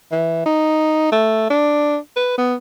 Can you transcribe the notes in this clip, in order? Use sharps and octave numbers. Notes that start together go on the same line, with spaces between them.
E3
D#4
A3
D4
B4
B3